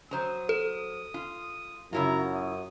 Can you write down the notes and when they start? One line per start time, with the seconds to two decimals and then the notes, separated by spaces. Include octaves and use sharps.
0.11 F#3 C5 A#5 D#6
0.49 A4
1.14 F4
1.93 F#2 C#3 E4 F4 A#5
2.35 D#6